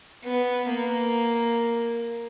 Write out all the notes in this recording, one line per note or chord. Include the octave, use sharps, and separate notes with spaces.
B3
A#3